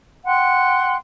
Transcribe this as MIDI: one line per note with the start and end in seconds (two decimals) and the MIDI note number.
0.24 0.94 78
0.24 0.94 79
0.24 0.94 84
0.24 0.94 90